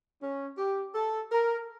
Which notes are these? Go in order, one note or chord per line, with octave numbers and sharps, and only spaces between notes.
C#4
G4
A4
A#4